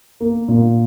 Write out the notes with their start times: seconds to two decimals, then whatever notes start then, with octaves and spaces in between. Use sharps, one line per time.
0.20 A#3
0.48 A#2